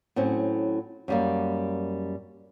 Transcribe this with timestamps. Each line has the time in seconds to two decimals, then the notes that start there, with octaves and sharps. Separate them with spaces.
0.16 A2 F#3 C4 C#4
1.08 F#2 G3 A#3